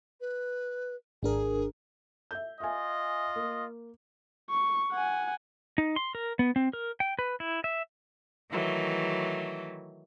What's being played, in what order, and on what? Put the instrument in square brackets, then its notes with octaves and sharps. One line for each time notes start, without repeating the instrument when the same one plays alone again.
[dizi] B4
[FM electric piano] G#1 D4 A#4 [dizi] G#4
[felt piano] E5 G6
[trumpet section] F4 D#5 [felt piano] E5 G#5
[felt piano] A#3
[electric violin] C#6
F#5 G#5
[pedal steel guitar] D#4
C6
A#4
B3
C4
A#4
G5
B4
E4
E5
[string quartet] D#3 E3 F#3 A3